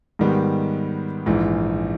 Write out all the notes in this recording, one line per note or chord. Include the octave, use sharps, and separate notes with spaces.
G#2 D#3 G3 B3
A#1 G#2 E3